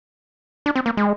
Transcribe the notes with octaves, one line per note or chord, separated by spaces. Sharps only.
D4
C4
A#3
G#3